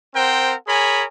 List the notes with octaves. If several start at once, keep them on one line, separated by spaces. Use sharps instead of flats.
C4 A#4 C5 F#5 G5
G#4 A#4 C#5 G#5 B5